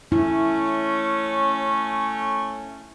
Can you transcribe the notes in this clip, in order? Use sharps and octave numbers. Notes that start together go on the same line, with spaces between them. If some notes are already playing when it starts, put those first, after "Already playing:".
A3 C#4 E4